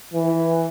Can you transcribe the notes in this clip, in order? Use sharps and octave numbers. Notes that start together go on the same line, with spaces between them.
E3